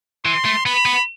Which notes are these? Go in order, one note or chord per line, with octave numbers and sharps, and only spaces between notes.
E3 C6
A3
B3 B5
B3